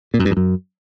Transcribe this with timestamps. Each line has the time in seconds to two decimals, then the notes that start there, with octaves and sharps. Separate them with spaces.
0.14 A#2
0.19 F#2
0.25 G2
0.31 F2
0.37 F#2